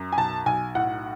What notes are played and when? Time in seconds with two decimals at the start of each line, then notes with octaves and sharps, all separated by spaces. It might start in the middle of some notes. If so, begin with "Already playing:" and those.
Already playing: F#2
0.12 G#5
0.18 B1 A5
0.46 B1 G#5
0.75 A2 F#5